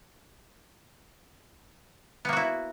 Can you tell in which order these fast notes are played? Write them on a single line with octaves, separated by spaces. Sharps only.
B3 A#3 F#4 E4